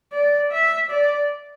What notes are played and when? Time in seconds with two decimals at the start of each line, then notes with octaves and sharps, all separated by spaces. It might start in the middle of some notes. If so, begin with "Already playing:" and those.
0.13 D5
0.52 E5
0.90 D5